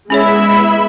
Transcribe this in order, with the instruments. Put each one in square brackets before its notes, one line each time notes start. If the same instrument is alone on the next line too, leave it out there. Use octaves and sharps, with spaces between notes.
[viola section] G#3 B3 E5 [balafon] C#4 G#4 C#5 [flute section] E4 B5